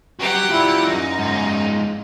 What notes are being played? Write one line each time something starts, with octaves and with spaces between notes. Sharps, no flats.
F#4 G4 F#5 A#5
G3 E4 F4
F#2 D#4
G#2 F4